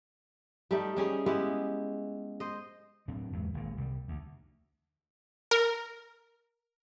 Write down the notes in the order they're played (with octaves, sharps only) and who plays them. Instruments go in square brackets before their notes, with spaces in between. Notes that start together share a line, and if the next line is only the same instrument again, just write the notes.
[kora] G3 A3 D#4
G3 C#4 G#4
G#3 B3 E4 G4
C5 D#5
[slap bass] A2 F#3 C4 D4
E2 G#2 F#3
G#1 A#2
C2 G3
D2
[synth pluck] A#4